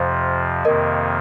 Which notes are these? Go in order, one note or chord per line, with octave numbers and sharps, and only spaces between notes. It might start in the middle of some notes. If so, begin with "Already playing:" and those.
Already playing: F2 C3 F3 C5 F5
F2 C3 D#3 A#3 A#4 D#5